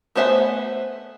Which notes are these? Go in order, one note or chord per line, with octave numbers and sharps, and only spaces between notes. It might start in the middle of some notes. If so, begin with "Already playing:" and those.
A3 B3 C5 E5 G#5